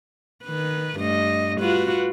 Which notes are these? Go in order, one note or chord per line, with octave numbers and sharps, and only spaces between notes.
D#3 B4
G2 A3 D#5
F4 F#4 B4